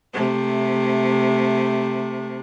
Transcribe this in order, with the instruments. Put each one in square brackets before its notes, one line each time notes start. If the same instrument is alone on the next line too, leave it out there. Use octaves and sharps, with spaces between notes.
[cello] C3 A3